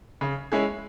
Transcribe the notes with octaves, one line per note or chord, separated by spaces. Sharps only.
C#3
G#3 C#4 E4 G#4